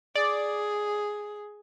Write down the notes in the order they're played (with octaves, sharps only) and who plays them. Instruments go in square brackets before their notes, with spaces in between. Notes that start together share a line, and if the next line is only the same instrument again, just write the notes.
[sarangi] G#4 [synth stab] D5